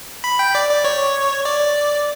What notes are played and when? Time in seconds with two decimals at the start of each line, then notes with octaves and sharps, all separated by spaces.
0.24 B5
0.39 G5
0.55 D5
0.70 D5
0.85 C#5
1.45 D5